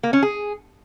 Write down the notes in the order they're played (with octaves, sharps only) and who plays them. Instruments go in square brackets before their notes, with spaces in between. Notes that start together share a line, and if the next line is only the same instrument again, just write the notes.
[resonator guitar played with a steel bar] A#3
C#4
G#4